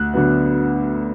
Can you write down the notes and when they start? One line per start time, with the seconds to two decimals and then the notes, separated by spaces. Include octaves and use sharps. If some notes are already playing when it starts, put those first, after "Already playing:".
Already playing: D2 F#6
0.14 D3 F#3 B3